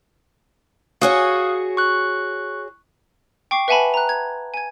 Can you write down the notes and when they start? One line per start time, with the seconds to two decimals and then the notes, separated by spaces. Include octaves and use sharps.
1.01 F#4 G#4 C#5 F5 D#6 F#6
1.77 C#6 F#6
3.51 G5 C#6 D6 C7
3.68 B4 E5 F#5 G#5 A5 B5
3.94 A#5 F#6
4.09 G#6
4.54 G#5 G#6